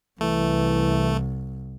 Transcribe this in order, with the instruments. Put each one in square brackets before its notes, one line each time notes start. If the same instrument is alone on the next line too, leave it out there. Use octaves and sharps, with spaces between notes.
[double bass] C2 [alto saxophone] E3 [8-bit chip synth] A3